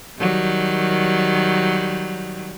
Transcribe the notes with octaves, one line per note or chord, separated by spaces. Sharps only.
D#3 F#3 G3